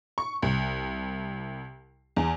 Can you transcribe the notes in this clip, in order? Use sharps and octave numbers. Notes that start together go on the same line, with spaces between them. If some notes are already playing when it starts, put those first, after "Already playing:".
C#6
C2
E2